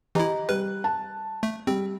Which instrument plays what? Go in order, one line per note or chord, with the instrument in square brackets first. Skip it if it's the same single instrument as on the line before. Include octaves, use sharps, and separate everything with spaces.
[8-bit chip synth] E3 E4 [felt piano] G4 D#5 A#5
[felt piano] G3 F#6 [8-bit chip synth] B4
[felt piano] A5
[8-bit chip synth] A3
[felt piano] G3 [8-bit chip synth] C4